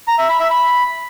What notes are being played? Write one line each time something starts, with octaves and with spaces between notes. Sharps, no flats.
A#5
E5
B5
E5
B5